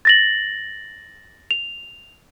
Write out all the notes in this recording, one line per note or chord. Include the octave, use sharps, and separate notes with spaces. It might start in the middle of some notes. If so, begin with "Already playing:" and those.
A6 A#6 F#7
F7